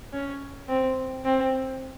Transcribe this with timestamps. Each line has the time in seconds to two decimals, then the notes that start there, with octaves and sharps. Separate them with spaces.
0.13 C#4
0.69 C4
1.25 C4